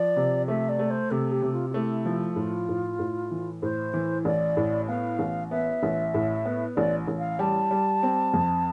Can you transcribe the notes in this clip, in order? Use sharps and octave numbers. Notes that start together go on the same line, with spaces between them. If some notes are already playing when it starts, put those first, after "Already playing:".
Already playing: F3 D5
C3
A3 E5
D5
A3
C5
C3 A4
G4
C3
F4
F4
A3 E4
F3
A2 F4
A2
A2
E3
A2 C5
E3
A1 D5
A2
B3 F5
A1
B3 E5
A1
A2
B3
A1 D5
A1
F5
G3 A5
G3
C4
F2